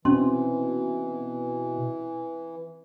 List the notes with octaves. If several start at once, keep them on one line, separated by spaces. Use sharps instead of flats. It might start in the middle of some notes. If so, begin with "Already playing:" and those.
B2 E3 C4 C#4 C6